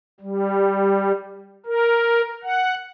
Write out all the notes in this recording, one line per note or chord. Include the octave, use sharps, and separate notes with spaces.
G3
A#4
F#5